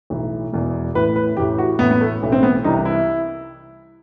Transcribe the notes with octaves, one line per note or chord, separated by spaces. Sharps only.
B1 A2 E3
E1 E2 B2
A1 A2 E3 B4
B4
A1 A2 E3 G4
F#4
A1 A2 E3 B3
B3
A3
B1 A2 E3
C4
B3
C2 C3 E3 D#4
E4